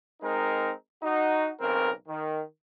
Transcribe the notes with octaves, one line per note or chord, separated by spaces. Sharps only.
G#3 C4 D#4 A#4
D#4 F#4
B1 C#3 C4 A#4
D#3